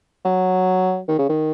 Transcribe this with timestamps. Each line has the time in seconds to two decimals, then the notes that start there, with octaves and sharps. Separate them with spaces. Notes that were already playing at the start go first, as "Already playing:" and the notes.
0.25 F#3
1.08 D#3
1.18 C#3
1.29 D#3